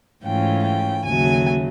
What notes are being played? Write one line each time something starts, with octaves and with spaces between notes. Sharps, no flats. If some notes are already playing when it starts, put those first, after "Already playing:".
G#2 E3 A3 C#4 F4 G5
G5
D#2 C#3 F#3 A3 G#5